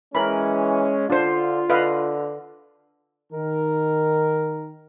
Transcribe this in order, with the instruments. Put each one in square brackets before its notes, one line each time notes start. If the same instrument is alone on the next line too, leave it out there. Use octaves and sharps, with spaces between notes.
[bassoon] E3 [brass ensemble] G#3 C#4 [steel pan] A#4 B5
[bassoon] D3 [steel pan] D4 C5 [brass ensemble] F4
[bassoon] D3 [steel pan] B4 D#5 F5
[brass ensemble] D#3 A#4